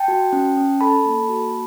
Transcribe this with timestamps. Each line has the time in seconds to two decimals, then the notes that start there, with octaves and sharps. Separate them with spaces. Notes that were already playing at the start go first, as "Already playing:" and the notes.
Already playing: G5 A5
0.08 F#4
0.33 C#4
0.57 C#4
0.81 A4 A5 B5
1.06 A#3
1.29 F#4